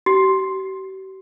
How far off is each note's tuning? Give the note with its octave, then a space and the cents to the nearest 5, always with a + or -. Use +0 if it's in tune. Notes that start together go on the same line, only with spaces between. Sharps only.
G4 -45